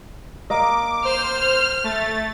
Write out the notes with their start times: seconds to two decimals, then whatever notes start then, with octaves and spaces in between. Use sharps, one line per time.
0.50 A#3 D#5 D6
1.05 C5 F6
1.84 A3 A6